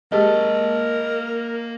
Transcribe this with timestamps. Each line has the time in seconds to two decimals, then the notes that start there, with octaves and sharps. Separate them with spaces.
0.12 G#3 A#3 G4 G#4 A#4 D#5 A5